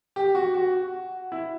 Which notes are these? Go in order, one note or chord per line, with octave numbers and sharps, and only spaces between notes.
G4
F#4
F#4
E4